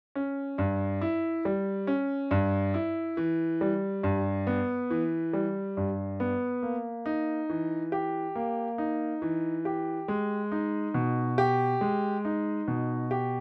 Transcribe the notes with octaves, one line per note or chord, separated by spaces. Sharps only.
C#4
G2
E4
G3
C#4
G2
E4
E3
G3
G2
B3
E3
G3
G2
B3
A#3
D#4
E3
G4
A#3
D#4
E3
G4
G#3
D#4
B2
G4
G#3
D#4
B2
G4